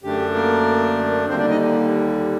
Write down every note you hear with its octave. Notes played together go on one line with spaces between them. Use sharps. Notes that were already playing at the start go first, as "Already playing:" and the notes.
F#2 D3 A3 D4 G4
A#3 A#4
D#2 D3 G3 A#3 C4 D4 C5
D4 D5
D#4 D#5